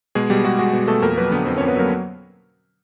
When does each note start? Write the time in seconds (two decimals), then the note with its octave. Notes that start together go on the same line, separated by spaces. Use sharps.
0.15 B2 G#3 G#4
0.30 B2 G3 G4
0.44 G#3 F#4
0.59 G#3 F#4
0.73 B2
0.88 B2 A3 A4
1.02 F2 A#3 A#4
1.17 F#3 B3 B4
1.32 D3 B3 B4
1.46 F2 C4 C5
1.57 F2 C#4 C#5
1.68 B3 B4
1.76 F#3 A#3 A#4